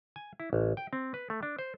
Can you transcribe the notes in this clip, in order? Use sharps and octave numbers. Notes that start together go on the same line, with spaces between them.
G#5
E4
A1
G5
C4
B4
A3
D4
C5